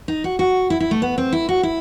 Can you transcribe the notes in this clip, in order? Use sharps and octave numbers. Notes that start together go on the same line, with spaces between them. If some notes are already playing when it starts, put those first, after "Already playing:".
D#4
F#4
F#4
E4
E4
A3
B3
C4
E4
F#4
E4